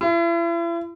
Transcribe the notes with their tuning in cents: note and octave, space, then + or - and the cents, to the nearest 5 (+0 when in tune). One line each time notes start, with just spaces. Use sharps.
E4 +40